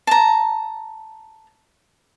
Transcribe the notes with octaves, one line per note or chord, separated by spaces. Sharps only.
A5 A#5